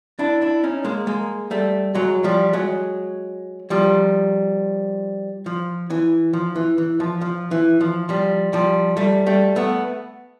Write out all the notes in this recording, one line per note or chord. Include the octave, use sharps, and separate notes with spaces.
D4 E4
D4 E4
C#4 D#4
G#3 A#3
G#3 A#3
G3 A3
F#3 G#3
F3 G3
F#3 G#3
F3 G3
F3
E3
F3
E3
E3
F3
F3
E3
F3
F3 G3
F3 G3
G3 A3
G3 A3
A3 B3